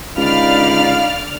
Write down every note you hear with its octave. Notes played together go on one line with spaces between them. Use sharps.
C#2 D3 D#4 D5 F5 B5 F6